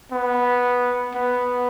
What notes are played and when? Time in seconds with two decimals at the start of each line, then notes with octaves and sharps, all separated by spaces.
0.12 B3
1.15 B3